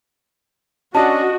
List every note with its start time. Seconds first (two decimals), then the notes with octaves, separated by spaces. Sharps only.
0.95 C#4 D4 F#4 D5 D#5 A5